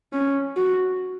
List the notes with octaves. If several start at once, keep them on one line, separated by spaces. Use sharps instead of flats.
C#4
F#4